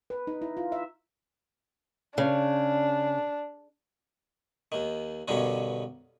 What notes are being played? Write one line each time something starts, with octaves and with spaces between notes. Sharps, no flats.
B4
D#4
E4
F4
E5
C#3 D4
D#2 D#3
G2 B2 D3 D#3 C#4